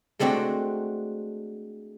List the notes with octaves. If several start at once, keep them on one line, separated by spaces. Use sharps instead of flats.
G#3 A3 C4 D4 F#4